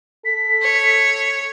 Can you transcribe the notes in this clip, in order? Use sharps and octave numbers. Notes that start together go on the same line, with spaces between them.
A4 B6
C#5